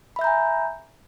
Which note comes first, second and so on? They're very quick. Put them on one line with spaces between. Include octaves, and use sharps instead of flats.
B5 E5 G6 A#5 G#5